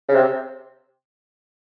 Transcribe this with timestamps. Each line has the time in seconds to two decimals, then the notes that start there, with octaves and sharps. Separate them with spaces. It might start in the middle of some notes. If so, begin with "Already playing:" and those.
0.09 C#3
0.14 C3